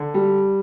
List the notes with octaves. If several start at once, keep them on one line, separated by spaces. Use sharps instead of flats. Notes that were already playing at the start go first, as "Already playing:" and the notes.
Already playing: D3
G3